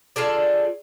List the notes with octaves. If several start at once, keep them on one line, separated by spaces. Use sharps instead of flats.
F4 G#4 A4 D5